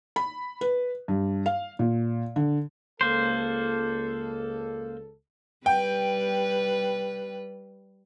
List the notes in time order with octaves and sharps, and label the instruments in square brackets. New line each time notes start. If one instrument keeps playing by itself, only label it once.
[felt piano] B5
B4
G2
F5
A#2
D3
[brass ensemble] C#2 A4 [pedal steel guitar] A#3 C5
[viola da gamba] G3 B4 [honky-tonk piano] G5